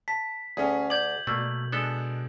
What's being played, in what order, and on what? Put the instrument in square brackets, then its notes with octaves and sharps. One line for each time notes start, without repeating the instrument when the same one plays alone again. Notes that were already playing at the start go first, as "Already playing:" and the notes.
[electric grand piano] A5 [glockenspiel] B6
[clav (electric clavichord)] D2 [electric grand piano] C#4 G#4
[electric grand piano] D5 D6 [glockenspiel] G6 G#6 F#7
[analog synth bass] B2 [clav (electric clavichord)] A3 A#3
[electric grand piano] G#3 D4 [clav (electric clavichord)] B3 A4